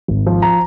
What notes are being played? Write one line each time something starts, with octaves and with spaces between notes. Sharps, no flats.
G#1
F3
A#5